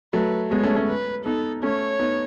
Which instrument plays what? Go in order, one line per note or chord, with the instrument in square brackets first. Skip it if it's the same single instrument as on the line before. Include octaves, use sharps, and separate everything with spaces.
[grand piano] F#3 A3 [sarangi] B4
[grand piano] G#3 B3 [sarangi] C#5
[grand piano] A3 C#4
A3 C#4
[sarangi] B4
[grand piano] B3 D#4 [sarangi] A4
[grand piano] A3 C#4 [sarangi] C#5
[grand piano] B3 D#4